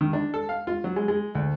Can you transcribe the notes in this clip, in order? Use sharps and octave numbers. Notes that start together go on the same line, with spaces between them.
D#3
D4
A4
F5
F4
F#3
G#3
G#3
D2